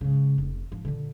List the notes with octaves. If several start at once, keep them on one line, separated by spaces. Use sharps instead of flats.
G#2 C#3
F1
G#2 F3
A#2 D3